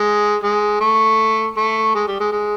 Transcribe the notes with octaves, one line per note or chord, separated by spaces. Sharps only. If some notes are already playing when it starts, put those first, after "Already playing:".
Already playing: G#3
G#3
A3
A3
G#3
G3
G#3
G#3